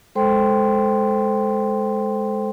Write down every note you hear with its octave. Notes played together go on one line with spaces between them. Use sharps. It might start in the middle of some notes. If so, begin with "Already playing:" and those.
G#3 A4 C5 G5 C6